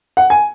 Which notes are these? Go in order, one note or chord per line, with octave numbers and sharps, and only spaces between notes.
F#5
G#5